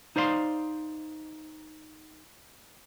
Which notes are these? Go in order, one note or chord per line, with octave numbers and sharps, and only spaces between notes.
D#4 C5 D5 F5 B5 C6